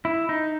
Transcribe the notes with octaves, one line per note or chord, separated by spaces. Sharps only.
E4
D#4